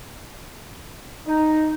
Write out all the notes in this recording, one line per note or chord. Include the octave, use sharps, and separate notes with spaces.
D#4